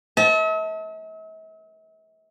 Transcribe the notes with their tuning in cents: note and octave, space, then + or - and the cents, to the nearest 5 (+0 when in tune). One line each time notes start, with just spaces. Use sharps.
E5 -45 A5 +0